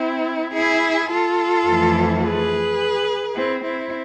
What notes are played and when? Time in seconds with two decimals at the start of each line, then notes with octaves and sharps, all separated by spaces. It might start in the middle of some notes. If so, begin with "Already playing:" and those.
Already playing: C4 E4
0.54 E4 G#4
1.11 F4 A4
1.66 F2 E3 A3
2.23 G#4 B4
3.36 C4 E4
3.64 C4 E4